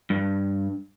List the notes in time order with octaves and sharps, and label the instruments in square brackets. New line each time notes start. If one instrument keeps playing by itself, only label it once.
[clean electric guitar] G2